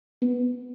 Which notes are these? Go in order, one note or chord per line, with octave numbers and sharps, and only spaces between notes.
B3